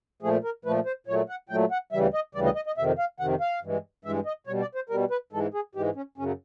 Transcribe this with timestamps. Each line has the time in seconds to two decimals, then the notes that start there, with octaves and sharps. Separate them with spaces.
0.22 A#2 F3 A3 G#4
0.44 A#4
0.65 A#2 F3 A3 B4
0.86 C5
1.07 A#2 F#3 A3 C#5
1.29 F#5
1.49 A#2 F#3 A3 G5
1.71 F#5
1.92 D2 C#3 E3 G3 E5
2.14 D#5
2.35 D2 C#3 E3 G3 D5
2.45 D#5
2.56 D#5
2.67 D#5
2.78 F2 C3 D#3 E5
2.99 F5
3.20 F2 C3 D#3 F#5
3.40 F5
3.62 G2 E3 G#3
4.05 G2 E3 G#3 E5
4.26 D#5
4.47 B2 G3 C#5
4.61 D5
4.75 C5
4.89 B2 G3 A#4
5.11 B4
5.32 G#2 E3 G#3 A4
5.54 G#4
5.75 G#2 E3 G#3 G4
5.95 C#4
6.18 F#2 C#3 F#3 C#4